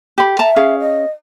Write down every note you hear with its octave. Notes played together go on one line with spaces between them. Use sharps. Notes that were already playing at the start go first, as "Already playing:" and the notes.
G4 B5
E5 A5 A#5
C#4 G#4 F5
D#5